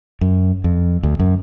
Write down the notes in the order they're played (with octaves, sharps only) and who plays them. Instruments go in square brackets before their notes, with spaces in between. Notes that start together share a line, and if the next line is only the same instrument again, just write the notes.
[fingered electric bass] F#2
F2
D2
F#2